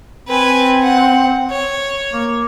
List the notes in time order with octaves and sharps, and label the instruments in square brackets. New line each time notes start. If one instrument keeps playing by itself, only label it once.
[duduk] C4 [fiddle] B4 G#5
[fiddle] F#5
C#5
[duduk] A#3